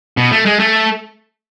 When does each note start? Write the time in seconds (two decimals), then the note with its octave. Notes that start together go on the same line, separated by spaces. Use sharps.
0.17 B2
0.31 A3
0.46 G#3
0.59 A3